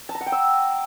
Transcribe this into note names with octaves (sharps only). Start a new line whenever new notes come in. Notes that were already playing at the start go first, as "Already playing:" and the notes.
A5
A#5
F#5
G5
E6